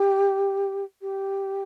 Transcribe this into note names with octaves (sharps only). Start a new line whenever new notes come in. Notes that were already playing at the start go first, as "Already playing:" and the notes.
Already playing: G4
G4